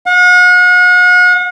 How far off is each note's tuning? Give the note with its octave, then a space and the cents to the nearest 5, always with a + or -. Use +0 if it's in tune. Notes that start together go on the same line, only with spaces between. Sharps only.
F#5 -40